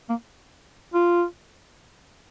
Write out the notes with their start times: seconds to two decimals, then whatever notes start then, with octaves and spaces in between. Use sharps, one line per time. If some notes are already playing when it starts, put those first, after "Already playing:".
0.09 A#3
0.94 F4